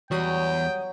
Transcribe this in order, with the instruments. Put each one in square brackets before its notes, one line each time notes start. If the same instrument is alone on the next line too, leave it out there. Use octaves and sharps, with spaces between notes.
[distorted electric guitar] E2 [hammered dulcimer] F#3 [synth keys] G3 F#4 D#6 [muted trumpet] G5